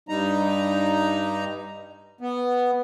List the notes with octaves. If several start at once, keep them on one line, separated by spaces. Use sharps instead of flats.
G2 G3 D#4 A#5
B3